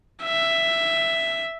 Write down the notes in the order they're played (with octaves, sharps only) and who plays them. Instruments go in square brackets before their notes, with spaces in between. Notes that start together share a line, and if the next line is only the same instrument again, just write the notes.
[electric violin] E5